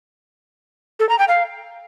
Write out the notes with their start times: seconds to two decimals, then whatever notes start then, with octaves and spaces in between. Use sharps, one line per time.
1.00 A4
1.09 A#5
1.19 G5
1.28 F5